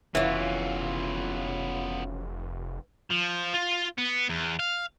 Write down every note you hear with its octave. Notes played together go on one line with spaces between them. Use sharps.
F1 C#3 E3 F#3 B3 F4
F3
F4
B3
E2
F5